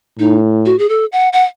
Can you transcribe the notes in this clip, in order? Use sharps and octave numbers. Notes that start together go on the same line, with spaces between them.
A2 D#4
F#4
G#4
A4
F#5
F#5